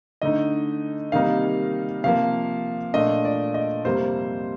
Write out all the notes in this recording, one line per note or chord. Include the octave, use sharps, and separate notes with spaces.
D3 A3 D#4 D#5
C3 D#3 G3 A#3 D#4 F5
C3 F3 A#3 F5
A#2 A3 D4 D#5
D5
D#5
F2 C3 G3 A#3 C5